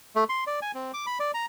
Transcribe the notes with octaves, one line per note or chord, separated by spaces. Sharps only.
A3
C6
D5
G#5
C4
D6
B5
D5
A#5